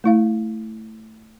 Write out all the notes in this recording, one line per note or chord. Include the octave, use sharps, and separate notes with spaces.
A3 E4 F5